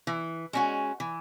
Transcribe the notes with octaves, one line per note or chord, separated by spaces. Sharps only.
E3
G#3 C#4 F#4
E3